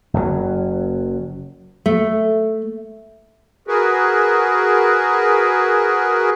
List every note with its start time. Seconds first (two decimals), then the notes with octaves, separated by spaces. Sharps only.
0.14 F#1 F#2 A2 F#3
1.86 A3
3.68 F#4 G#4 A#4 B4